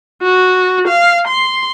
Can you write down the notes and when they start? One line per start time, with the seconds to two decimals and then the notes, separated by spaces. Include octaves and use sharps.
0.22 F#4
0.88 F5
1.28 C6